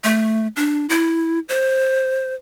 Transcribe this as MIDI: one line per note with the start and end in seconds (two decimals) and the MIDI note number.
0.04 0.47 57
0.56 0.86 62
0.89 1.39 64
1.49 2.34 72